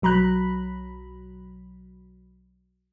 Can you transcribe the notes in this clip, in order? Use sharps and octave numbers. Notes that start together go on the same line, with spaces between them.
B1 F#3 A#5 B5 F#6